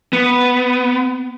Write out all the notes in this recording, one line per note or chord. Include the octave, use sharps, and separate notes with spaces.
B3